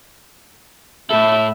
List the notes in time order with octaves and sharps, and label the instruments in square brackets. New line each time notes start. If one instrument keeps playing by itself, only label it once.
[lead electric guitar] A2 A4 [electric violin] E5